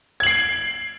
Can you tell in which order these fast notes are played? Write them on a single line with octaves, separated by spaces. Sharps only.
G#6 F#7 C7 D7